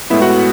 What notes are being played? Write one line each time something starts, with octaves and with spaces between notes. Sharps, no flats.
A2 G#3 B3 E4 E5
F#4 F#5